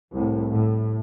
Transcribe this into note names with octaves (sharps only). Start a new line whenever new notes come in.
C2 A2
A2